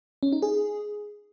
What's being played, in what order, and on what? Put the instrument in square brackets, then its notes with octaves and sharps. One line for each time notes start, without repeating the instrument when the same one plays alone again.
[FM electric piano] C#4
D#4
G#4